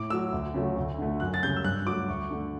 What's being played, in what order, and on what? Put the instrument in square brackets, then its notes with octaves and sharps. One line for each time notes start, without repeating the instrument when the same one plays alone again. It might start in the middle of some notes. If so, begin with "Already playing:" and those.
Already playing: [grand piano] A2 D6
F#3 A3 E6
D2
C#3 F#3 A3
D2
D3 A3
F#2 F#6
A6
C#3 G3 G6
E6
G2 F#6
F#3 A3 D6
D2 C#6
D3 A3